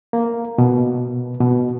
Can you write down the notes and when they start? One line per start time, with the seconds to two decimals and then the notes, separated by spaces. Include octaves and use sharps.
0.13 A#3
0.58 B2
1.41 B2